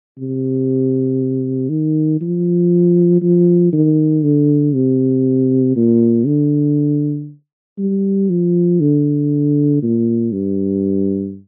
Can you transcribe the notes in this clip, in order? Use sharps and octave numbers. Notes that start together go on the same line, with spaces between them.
C3
D#3
F3
F3
D#3
D3
C3
A#2
D3
G3
F3
D3
A#2
G2